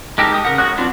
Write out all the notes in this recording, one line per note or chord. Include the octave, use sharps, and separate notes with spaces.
G#3 D#4 G4 A4 A#4
G4 D#6
C#3 A#4 F#5
G#3 F#4 C#5 D#6 F#6
F#3 B3 C4 D4 F4